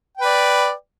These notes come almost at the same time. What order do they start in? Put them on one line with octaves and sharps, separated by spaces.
G5 B4 D5